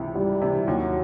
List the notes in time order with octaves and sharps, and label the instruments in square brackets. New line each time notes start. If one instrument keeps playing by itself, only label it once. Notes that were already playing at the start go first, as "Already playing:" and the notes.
Already playing: [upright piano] C#2 C3 E3
[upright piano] C#2 [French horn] G3
[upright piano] C3 E3
[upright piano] D#2 [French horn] F#3